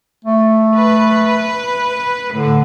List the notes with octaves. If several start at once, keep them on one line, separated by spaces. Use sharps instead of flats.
A3
B4
A2 D3